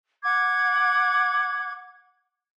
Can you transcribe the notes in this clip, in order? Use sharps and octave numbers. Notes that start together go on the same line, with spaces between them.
F#5 D6 G#6